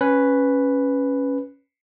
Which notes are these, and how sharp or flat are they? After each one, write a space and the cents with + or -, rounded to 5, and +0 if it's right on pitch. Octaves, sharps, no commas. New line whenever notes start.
C#4 +0 B4 +0